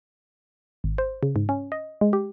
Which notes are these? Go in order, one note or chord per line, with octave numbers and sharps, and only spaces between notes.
G#1
C5
C#3
G#2
C#4
D#5
G#3
G4